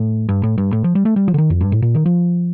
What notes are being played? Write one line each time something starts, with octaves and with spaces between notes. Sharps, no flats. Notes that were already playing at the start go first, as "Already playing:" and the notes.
Already playing: A2
G2
A2
G2
A2
F3
G3
A3
G3
F3
D3
D#3
F2
G2
A2
A#2
D#3
F3